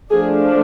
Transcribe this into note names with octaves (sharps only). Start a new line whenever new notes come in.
F3 A3 D4 G#4